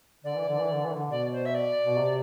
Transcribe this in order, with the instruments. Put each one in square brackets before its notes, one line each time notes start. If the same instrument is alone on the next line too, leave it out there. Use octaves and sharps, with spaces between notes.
[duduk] D3 [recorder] D5
[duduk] E3
D3
E3
D3
E3
D3
[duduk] B2 [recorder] D5
[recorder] C5
E5
D5
[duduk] B2
C3